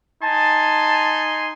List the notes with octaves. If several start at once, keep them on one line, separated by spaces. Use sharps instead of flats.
D#4 G#5 A5 C6